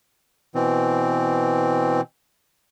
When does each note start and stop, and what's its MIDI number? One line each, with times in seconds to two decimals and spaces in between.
0.55 2.01 47
0.55 2.01 52
0.55 2.01 60